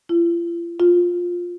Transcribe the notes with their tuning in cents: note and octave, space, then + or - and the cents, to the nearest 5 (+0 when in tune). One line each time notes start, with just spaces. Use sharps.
F4 -45
F4 +10